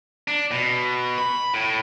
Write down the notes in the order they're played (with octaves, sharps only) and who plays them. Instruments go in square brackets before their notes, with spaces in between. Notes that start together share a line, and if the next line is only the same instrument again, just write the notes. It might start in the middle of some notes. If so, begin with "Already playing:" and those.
[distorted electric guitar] D4
B2
B5
A2